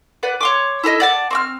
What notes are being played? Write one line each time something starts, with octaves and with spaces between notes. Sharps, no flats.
B4 D5 F#5
C#5 C6 D6
E4 A4 A#4 D#5
D5 F#5 A5
C4 C#6 F6